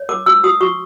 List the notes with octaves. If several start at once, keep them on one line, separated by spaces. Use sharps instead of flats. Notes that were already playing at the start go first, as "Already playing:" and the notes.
Already playing: C#5
A#4 D6
F#4 E6
F#4 D#6
F#4 C#6